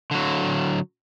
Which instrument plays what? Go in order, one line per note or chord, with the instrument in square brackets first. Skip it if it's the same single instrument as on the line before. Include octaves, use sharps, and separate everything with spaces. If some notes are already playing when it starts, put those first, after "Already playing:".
[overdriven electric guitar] D3 F#3